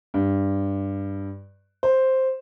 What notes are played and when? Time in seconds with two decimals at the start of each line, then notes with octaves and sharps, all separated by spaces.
0.14 G2
1.83 C5